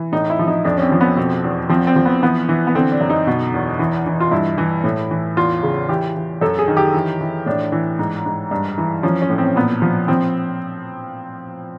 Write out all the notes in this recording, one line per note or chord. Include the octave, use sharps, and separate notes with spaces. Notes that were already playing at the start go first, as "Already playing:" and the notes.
Already playing: E3
A2 D#4
E4
F3
D#4
F2 D4
C#4
C4
F3
B3
B2 C4
E2
F3 C4
C4
F3
B3
E3 B3
E3
B3
D3 C4
D4
F#2
D#4
B2
E2
E3
E3
F4
G2 E4
E3
A2
E3
E2 F4
C#3
E3 G4
E3
F#2 A4
G#4
D#3
G4
E3
E3
A2 D4
E3
G#2
G#2
G2
E3
F3 C#4
C#4
A2
C4
A#2 B3
F3
F3 C4